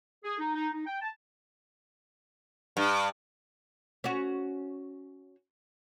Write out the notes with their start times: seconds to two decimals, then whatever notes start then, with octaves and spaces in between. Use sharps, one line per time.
0.24 G#4
0.39 D#4
0.55 D#4
0.73 D#4
0.86 G5
1.01 A5
2.77 G2
4.04 C#4 F#4